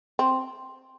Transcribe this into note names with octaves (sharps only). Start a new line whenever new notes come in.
C4